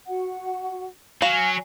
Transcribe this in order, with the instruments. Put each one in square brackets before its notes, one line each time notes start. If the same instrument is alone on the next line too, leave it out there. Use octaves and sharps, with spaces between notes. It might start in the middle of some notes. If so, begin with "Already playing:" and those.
[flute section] F#4 F#5
[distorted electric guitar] F#3 [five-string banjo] F5 [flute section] G#5